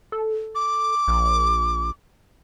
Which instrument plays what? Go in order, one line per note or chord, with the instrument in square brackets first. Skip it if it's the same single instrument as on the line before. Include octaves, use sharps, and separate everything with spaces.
[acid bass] A4
[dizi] D6
[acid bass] A#1